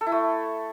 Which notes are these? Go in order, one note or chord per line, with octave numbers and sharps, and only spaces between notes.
A4
E4
A3